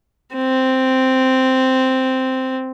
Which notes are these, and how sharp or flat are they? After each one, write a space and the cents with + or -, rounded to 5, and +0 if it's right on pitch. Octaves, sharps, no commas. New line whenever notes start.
C4 -5